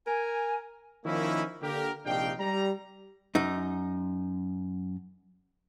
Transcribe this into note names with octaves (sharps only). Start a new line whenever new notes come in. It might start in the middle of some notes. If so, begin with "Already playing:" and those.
A#4 G#5
D#3 F3 A#3 C#4 D#4 E4
D3 A#3 G4 A#4
A#1 C3 D4 D#4 F5 G5
G3 A#5
F#2 D#4